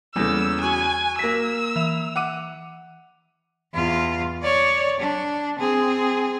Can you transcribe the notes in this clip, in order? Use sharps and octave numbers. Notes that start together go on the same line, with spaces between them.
E2 C#3 G3 A#3 A4 E6
F#4 G#5 C#6 F#6
A#3 E6 A#6 B6
E3 E5 F7
F#5 D6 D#7
E2 F4
C#5 D5
D4
C4 G#4